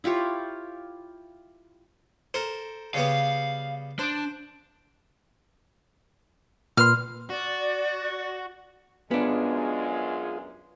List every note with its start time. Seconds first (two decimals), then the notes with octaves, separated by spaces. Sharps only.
0.04 E4 F4 G4 C#5
2.34 A4 A#4 C5
2.94 C#3 G3 B3 F5
3.99 D4 C5 D6
6.77 A#2 B4 C6 F6
7.30 F#4 D5
9.11 F#2 G#3 B3 D4 F4 G#4